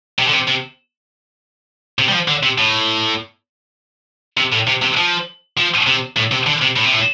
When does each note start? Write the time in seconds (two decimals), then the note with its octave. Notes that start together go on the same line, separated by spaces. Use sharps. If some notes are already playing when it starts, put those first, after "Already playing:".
0.19 C3
0.28 D3
0.33 C3
0.48 C3
1.99 C3
2.09 G3
2.13 F3
2.28 D3
2.43 C3
2.58 A2
4.38 C3
4.53 A2
4.68 C3
4.82 C3
4.97 F3
5.58 F3
5.87 C3
6.17 A2
6.32 C3
6.47 D3
6.62 C3
6.76 A2
6.86 C3
6.93 A2